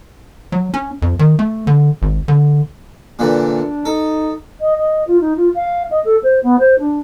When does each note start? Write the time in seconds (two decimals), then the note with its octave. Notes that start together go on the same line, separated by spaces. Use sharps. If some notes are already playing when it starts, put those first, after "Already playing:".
0.52 F#3
0.74 C#4
1.02 F2
1.19 D#3
1.39 A3
1.67 D3
2.02 G#1
2.28 D3
3.19 A#2 D3 E3 D4
3.85 D#4 A4
4.60 D#5
4.76 D#5
5.07 F4
5.21 D#4
5.37 F4
5.55 F5
5.91 D#5
6.05 A4
6.23 C5
6.43 B3
6.59 C5
6.79 D4